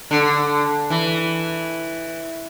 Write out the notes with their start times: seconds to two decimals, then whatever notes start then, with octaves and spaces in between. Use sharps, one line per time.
0.11 D3
0.90 E3